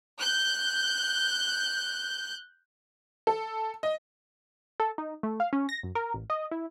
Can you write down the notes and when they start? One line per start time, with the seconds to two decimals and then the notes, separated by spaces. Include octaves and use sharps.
0.19 F#6 G6
3.27 A4
3.83 D#5
4.80 A4
4.98 D#4
5.23 A3
5.40 F5
5.53 C#4
5.69 A#6
5.83 F#2
5.95 A#4
6.14 A1
6.30 D#5
6.51 E4